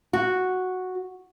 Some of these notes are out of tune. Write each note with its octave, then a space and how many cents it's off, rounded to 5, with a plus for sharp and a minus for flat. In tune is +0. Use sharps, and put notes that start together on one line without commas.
F#4 -5